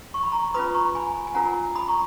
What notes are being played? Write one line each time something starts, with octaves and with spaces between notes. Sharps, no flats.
C#6
B5
A#5 C#6
C#4 F4 B4 B5 D#6
A#5 C#6
G#5 B5
G#5
C#4 F4 A#4 F#5 A#5
B5 D#6
A#5 C#6